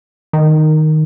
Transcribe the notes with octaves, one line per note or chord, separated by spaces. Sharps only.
D#3